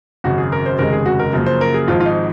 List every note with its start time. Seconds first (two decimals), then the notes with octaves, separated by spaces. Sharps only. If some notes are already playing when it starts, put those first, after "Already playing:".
0.24 G#1 F#2 C#3 F#4
0.38 G#4
0.52 A#4
0.66 C5
0.79 F1 D#2 C#3 G#3 A#4
0.92 G#4
1.06 F#4
1.19 A#4
1.33 F#2 C#3 F3 A#3
1.46 C5
1.61 A#4
1.74 G#4
1.88 G#1 G#2 F3 F4
2.00 F4
2.06 D#4